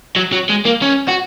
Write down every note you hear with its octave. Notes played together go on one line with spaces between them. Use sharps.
F#3
F#3
G#3
A#3
C#4
F#4